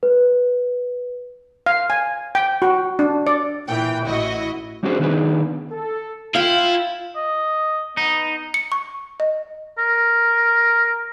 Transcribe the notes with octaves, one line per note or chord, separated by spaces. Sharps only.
B4
F5
G#5
G5
F#4
D4
D5
A#2 E3 G5
A1 E4 F#4 D#5
G3 C#4 D4 F#4 G#4 C5
D#3 B3 D4 D#4 G#4 B4
A4
E4 F4 F5 G5
D#5
B3 D#4
C#7
C#6
D#5
A#4